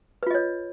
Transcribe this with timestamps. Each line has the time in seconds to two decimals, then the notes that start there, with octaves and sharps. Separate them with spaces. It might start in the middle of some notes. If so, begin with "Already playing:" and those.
0.23 B4
0.27 F4
0.30 D#5
0.34 C#5